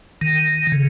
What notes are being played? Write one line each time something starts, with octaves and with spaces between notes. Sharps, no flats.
D#3
C#3